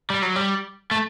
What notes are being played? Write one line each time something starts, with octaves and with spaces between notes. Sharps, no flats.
G3
F#3
G3
A3